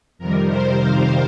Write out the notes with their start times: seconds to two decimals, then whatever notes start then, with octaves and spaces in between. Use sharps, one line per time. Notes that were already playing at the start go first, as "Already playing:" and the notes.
0.19 F2 C3 D#3 G3 A#4
0.49 C5
0.79 F5